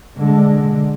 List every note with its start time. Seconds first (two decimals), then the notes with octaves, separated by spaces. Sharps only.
0.18 D3 G#3